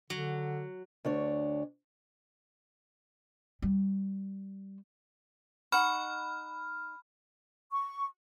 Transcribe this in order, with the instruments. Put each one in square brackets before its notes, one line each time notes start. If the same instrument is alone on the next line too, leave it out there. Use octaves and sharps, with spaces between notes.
[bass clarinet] D3 [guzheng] F#3
[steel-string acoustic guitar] D2 D4 C#5
[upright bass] G3
[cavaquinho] D#4 F#5 C#6 [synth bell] B5 F6
[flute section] C#6